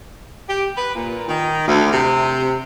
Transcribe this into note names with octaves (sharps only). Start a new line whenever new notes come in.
G4
B4
A#2
D#3
D2
C3